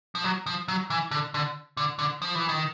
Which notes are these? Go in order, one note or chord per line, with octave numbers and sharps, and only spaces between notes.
F3
F#3
F3
F#3
E3
D3
D3
D3
D3
F3
E3
D#3